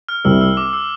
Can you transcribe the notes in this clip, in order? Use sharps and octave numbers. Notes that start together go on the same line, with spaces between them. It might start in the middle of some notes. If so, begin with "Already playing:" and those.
F6
C2 C3 G3 E6
E6
D6
E6